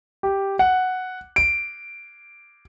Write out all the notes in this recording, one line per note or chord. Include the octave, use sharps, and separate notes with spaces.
G4
F#5
D7